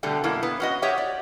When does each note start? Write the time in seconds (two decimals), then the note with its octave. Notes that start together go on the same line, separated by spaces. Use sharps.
0.03 B2 D3 G3 A3
0.24 F#2 B2 A#3 E4
0.43 B3
0.60 C#4 F#4 D#5
0.82 G4 C#5 D#5 E5 F#5
0.98 D5